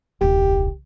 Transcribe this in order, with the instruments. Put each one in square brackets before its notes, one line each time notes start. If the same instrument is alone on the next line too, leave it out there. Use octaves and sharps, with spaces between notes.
[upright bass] D#1 C2 [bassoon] G4